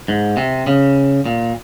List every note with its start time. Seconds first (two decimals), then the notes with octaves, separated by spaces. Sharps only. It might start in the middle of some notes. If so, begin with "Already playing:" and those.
0.08 G#2
0.37 C3
0.67 C#3
1.26 A#2